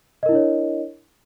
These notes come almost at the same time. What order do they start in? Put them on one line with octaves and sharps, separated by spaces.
D#5 A#4 E4 D4 C#5